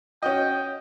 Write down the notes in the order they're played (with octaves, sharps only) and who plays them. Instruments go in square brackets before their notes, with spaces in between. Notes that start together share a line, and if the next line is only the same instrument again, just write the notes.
[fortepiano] C#4 F#4 D#5 [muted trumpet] G5